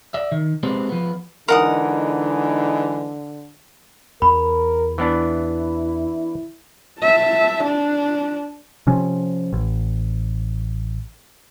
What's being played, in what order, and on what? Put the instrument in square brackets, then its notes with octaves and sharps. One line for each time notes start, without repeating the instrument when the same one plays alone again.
[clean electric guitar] D5 E5
D#3
G#3 B3 C4 G4 C5
F3 B3
[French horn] D3 [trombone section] E3 G#3 D#4 [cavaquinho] A#4 F#5 D#6
[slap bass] E2 [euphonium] A#4 [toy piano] B5
[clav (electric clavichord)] E3 B3 D4 [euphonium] E4
[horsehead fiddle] E5 A5
D4
[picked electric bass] C3 F3 C#4
A1